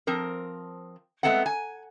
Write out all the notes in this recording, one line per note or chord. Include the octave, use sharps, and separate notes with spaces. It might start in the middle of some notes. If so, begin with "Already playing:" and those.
F3 C4 A#4
G#3 A3 B3 C4 F#5
G#5